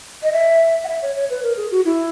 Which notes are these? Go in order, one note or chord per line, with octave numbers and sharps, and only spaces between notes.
D#5
E5
F#5
E5
C#5
C#5
B4
A#4
G#4
F#4
E4